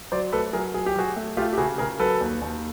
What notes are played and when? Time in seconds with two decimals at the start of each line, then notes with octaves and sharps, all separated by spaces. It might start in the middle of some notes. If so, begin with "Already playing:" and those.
0.12 F#3 C5 D5
0.32 A3 A4 B4
0.53 F#3 G#4 A#4
0.74 F#3 G#4
0.86 G4
0.96 F#3 F#4 G#4
1.16 A3
1.37 A3 F4 G4
1.53 G4
1.58 C#3 F#4 G#4
1.78 C#3 G#4 A#4
1.99 F#3 A4 B4
2.21 D#2
2.41 D#2